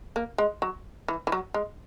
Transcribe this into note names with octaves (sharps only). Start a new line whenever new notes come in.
A#3
G#3
F#3
E3
E3
F#3
G#3